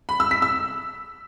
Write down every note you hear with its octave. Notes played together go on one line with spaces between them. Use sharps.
B5
E6
B6
E6